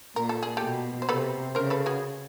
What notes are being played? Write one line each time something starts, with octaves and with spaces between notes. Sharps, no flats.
A#2 A#4
A4
G#4
G4 A4
B2
C5
C3 A4 B4
C#3 A#4 C5
A4 B4
F#4 G#4